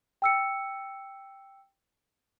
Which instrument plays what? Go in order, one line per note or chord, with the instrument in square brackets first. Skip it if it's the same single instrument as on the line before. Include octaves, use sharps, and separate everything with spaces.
[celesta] G5 E6 C#7